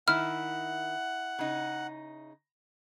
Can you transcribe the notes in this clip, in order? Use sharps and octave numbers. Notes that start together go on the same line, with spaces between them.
D#3 E4 F#5 F6
C#3 D#4